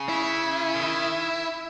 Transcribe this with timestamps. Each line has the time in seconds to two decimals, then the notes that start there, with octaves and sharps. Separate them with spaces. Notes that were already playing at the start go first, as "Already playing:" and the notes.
Already playing: C#3
0.09 E4
0.75 D#3